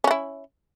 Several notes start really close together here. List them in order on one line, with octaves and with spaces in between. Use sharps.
C#4 F#4 E4